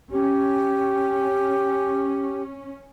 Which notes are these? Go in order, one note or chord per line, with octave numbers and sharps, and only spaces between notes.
C#4 G4